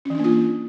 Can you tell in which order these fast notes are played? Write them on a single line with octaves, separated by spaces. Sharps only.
C#4 E3 D4 A#3 F4